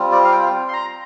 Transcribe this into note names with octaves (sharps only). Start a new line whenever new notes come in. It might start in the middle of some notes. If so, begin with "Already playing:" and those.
Already playing: G3 C4 F4
D5
F5
G5
C6
A#5